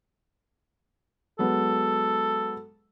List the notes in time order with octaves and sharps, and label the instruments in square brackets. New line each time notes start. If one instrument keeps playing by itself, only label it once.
[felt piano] F#3 G#3 B3 [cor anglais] A4